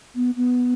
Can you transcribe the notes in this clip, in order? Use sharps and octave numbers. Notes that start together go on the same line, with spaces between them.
B3
B3